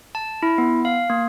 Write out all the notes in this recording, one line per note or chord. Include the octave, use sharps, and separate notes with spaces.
A5
E4
B3
F5
A#3